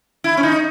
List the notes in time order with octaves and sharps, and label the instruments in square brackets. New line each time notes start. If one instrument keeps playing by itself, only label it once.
[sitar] E4
C#4
D#4